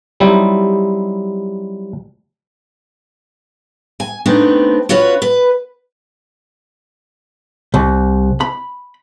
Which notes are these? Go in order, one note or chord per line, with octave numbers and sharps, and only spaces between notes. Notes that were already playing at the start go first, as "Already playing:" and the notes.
F#3 G3 C4 D#4 E4
G#5
A3 B3 C4 D4 D#4
C#4 F4 F#4 B4 C#5
B4
C2
B5